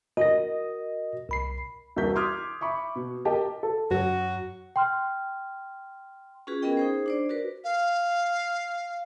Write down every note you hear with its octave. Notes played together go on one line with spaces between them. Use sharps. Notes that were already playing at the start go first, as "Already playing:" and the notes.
F#4 A#4 D#5 A#6
C2 B5 C7
E1 C2 F#4 A#4 G6 B6
C6 D6 D#6 F6 G#6
E5 B5 C#6 D6
B2
G4 A#4 D#5 A5
A4
F#2 F#3 F#4
G5 C6 F6
C#4 F4 F#4 G#4 B4
B3 C#4 G#4 A#4 D#5 G5
D#4 G#4 C5
D4 C5 D5
F#4 A#4 B4
F5